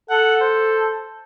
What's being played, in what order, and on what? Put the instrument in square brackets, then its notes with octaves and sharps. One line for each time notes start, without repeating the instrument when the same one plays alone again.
[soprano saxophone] A4 [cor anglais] F#5
[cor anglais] C5